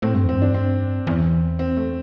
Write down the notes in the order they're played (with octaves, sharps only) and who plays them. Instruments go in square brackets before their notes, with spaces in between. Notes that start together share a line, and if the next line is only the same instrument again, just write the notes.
[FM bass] A2 [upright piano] C4
[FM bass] G2 [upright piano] C4
[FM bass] E2 [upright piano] C4
[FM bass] G2
[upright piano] D4
C4
[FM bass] E2
[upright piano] C4
A3